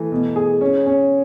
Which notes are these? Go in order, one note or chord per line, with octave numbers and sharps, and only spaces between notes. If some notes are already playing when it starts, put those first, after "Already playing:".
Already playing: E3 A3
B2
G#4
C#4
C#4